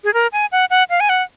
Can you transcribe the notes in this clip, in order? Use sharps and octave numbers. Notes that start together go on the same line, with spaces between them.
G#4
A#4
G#5
F#5
F#5
F5
G#5
F#5